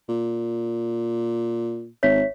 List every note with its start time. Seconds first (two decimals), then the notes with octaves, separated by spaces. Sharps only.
0.09 A#2
2.03 G#1 C#5 E5 B6